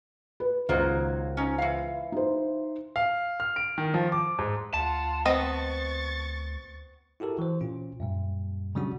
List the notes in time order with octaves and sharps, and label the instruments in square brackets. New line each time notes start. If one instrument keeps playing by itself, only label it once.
[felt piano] B4
[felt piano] C#2 C5 [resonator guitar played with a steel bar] D#3 F#3 A#3
[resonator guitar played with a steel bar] C#4 D#4
E3 F5
[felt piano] D#4 C5
[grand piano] F5
F6
D7
D#3
F3
D6
G#2
[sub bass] D2 [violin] F4 F#5 [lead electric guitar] A5
[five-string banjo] B3 C4 D#5 [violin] C#6 A6
[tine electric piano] E4 F#4 G4 A4 A#4
E3 C5
A#2 C#4 F4
F#2 A#2 G3
C#3 F#3 G3 C#4 D4 F#4